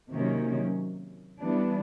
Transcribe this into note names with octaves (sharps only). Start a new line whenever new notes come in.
C3 D#3 F#3 A#3 C#4
E3 G3 B3 D4